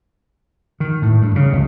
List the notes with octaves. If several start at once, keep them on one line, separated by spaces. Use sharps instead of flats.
D#3
A2
G2
C#3
F1 C#2 G#3